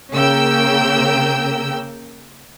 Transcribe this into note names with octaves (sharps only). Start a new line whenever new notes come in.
C#3 A#3 A#4 G5 E6